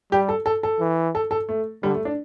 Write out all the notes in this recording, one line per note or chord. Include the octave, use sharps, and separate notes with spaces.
G3 G4
A4
A4
A4
E3
A4
A4
A3
D3 G3
A3
D4